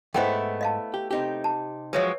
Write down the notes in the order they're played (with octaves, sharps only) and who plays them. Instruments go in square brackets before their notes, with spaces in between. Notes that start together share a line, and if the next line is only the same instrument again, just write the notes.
[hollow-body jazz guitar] E2 G#2 [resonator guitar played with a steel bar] A3 B3 E4 [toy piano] C5 F#5 G5
[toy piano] D#5 F5 A5
[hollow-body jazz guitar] G4
C3 D#4 G4
[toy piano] A5
[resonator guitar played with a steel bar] F3 F#3 G#3 [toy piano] B4 C#5 E5